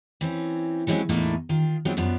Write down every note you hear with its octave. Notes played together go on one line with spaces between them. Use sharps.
E3 C4 C#4
E3 F#3 G#3 C4 C#4
E2 A2 A3 A#3 D4 D#4
D#3 F4
F3 F#3 G#3 B3 C4 D#4
F#2 F3 B3 D4